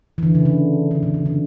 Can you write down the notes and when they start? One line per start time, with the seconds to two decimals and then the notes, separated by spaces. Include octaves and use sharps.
0.18 E3
0.23 D3
0.35 C#3
0.45 D3
0.91 D3
1.03 B2
1.14 C#3
1.26 D3